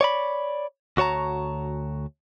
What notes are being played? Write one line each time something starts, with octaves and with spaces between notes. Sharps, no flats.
C#5 D5 B5
D2 F#4 C#5 A5 A#5